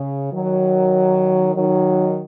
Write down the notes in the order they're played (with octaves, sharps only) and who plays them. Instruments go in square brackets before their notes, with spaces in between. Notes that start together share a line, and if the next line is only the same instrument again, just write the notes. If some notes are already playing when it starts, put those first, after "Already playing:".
Already playing: [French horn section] C#3
D#3 F#3
D#3 F#3